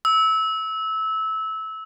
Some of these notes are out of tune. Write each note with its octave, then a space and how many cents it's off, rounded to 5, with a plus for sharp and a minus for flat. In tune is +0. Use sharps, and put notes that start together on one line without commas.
E6 -20